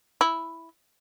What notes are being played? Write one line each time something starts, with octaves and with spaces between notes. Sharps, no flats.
E4